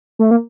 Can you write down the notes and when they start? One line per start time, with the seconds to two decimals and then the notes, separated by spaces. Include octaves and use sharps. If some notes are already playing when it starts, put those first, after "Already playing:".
0.19 A3
0.31 A#3